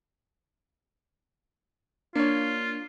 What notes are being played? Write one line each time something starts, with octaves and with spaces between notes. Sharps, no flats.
A#3 D4 F4 C#5